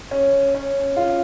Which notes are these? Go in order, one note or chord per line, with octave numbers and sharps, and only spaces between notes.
C#4
C#4
F4